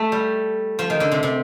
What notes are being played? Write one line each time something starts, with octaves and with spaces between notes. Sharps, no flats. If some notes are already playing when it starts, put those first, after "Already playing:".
Already playing: A3
G3
F3
D#3
D3
C3
C3